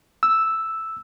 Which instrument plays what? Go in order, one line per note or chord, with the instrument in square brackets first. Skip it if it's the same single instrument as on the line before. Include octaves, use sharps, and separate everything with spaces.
[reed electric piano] E6